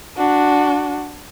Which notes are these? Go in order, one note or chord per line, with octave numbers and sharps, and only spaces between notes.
D4 F#4